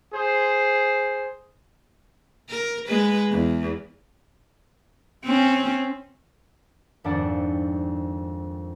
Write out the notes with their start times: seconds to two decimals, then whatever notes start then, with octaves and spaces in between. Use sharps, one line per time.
0.14 G#4 C5
2.49 A#4
2.87 G#3 B4
3.31 E2
5.25 C4 C#4
7.04 G#1 F2 G#2 D4 D5 F#5